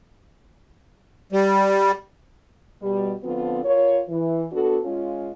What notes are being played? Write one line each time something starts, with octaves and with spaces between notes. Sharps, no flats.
G3
B2 G3
D3 F3 B3 C4 F4
F4 A#4 C#5
E3
B3 D4 F#4 A4
G#3 C#4 F4